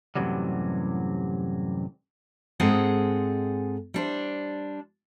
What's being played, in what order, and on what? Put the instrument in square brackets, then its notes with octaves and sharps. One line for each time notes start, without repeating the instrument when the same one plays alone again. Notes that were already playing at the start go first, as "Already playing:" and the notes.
[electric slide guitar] F#2 A2 C3 E3 F#3 G3
[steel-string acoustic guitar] G#2 G#3 C4 G#4 A4 F#5
G3 D4 C5